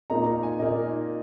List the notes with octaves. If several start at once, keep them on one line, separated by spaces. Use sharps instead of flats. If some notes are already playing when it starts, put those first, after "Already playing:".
A#2 A#3 D#4 A#5
A#5
G#5
A#2 A#3 D#4 D#5